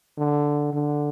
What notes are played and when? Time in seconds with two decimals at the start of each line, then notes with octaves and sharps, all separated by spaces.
0.17 D3
0.73 D3